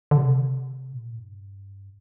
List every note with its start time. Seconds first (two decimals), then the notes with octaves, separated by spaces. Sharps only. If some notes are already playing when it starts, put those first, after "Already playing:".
0.11 D3
0.17 C3
0.93 A#2
1.13 A2
1.18 G2